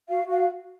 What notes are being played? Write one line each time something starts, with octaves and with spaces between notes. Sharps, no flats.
F#4 F5
F#4
F5